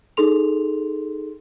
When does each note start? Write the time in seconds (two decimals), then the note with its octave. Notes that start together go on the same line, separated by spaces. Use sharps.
0.17 D#4 G#4 A4 C6 F7